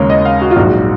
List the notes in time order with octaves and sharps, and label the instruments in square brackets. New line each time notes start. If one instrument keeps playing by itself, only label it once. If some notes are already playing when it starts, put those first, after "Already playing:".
Already playing: [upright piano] D#2 C#3 G#3 A#4 C#5
D#5
F5
F#4
F4
A#1 G#2 F#3 F#4